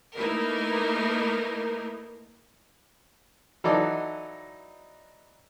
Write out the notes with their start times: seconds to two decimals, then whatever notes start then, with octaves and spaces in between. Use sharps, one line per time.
0.16 A3 A#3 D#4 E4 A#4 B4
3.64 E3 F#3 D#4 A4 D5 D#5